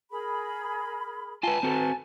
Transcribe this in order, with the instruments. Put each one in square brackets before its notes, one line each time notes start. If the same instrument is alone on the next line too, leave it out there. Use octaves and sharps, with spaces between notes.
[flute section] G#4 A#4 B5
[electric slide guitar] F4 B4 [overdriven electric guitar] G#5 A5
[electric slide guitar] C4 F#4 [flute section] A4 B4